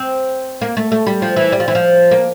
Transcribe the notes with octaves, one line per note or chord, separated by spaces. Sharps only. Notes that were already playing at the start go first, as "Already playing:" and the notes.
Already playing: C4
A#3
A3
A3
G3
F3
E3
G3
F3
E3
F3
A#3